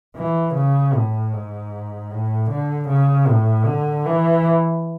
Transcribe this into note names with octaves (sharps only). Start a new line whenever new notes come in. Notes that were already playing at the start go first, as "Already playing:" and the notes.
E3
C#3
A2
G#2
A2
D3
C#3
A2
D3
E3